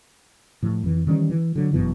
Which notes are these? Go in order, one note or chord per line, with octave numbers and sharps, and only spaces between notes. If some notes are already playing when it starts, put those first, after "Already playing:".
A2 F3
F2 E3
D#3 E3 G3 C#4
E3
D3 F#3
G1 F#2 B2 E3